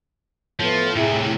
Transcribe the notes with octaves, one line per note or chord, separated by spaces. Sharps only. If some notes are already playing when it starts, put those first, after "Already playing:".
A2 F3 B3
A2 C3 E4 G#4